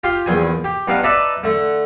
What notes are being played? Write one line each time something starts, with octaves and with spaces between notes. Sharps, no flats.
F4 G4 C6
A#1 E2 G#4 G5 G#5
G4
G2 B3 D4 D#4 F5
D#4 B4 D5 E5 A5
D3 A3